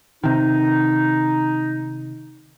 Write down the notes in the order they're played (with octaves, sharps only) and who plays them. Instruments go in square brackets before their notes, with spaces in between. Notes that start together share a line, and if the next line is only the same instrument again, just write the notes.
[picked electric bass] C3 D#3 [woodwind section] D#4